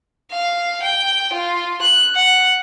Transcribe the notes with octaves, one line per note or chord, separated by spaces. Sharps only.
F5
G5
F4
F#6
F#5